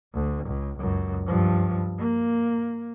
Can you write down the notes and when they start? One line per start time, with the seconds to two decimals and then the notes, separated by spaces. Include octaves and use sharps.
0.14 D2
0.46 C#2
0.79 C#2 F#2
1.26 G2 F3
1.98 A#3